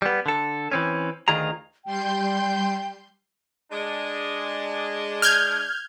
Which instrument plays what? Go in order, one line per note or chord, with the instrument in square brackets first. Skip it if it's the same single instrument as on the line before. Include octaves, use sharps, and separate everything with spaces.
[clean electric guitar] G3 B3
D3 A4
E3 C4 C#4
D2 D#3 F4 G#4 A#5
[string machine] G3 C6 G6 [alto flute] G5
[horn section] G#3 D4
[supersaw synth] F6 G6 G#6